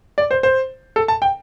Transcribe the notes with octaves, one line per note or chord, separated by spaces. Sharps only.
D5
C5
C5
A4
A5
G5